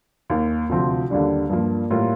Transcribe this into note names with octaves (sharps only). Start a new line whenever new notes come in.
D#2 D#3 A#3
D2 C3 F3 C4
D#2 D3 G3 D4
G2 F3 A#3
A2 G3 A#3 F4 A#4